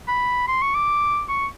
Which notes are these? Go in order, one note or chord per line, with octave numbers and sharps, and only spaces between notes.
B5
C6
C#6
D6
C#6